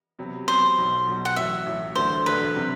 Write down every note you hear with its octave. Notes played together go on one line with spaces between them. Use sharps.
C3 F#3 B3
C3 F#3 B3 C5
B1 B2 F#3
B1 B2 F#3
F#5
A1 A2 F#3 E5
A1 A2 F#3
E1 D2 D3 F#3 A3 C5
E1 D2 D3 F#3 A3 B4
C3 F#3 C4 G4